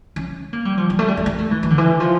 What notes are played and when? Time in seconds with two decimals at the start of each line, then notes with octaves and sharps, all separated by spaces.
0.16 C#4
0.53 A#3
0.65 G3
0.77 F3
0.90 G3
0.99 A3
1.08 G3
1.17 A3
1.26 A#3
1.38 A3
1.51 E3
1.63 E3
1.70 D3
1.78 E3
2.00 F3